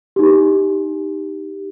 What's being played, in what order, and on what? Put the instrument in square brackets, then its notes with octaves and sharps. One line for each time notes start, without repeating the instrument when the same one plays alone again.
[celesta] D#4 G4